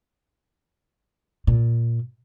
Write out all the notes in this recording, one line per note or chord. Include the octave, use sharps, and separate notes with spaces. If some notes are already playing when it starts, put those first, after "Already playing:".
A#2